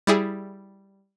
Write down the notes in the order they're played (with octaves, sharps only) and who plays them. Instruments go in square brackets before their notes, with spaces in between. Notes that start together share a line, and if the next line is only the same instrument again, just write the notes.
[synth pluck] G3 E4 G#4